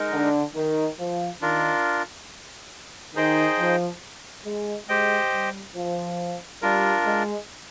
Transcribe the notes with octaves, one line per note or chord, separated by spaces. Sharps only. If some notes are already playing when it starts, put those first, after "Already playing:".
Already playing: G#3 D#4 A#4
D3
D#3
F3
D#3 D4 F4 A#4
D#3 D#4 G#4 C5 D#5 G5
F3
G#3
G#3 G4 C5 D#5 G5
G3
F3
G3 D4 F4 A#4
G#3